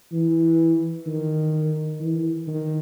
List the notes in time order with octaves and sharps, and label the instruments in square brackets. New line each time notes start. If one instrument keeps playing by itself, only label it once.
[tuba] E3
D#3
E3
D#3